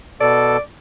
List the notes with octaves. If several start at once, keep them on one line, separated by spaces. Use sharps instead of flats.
B2 A4 D5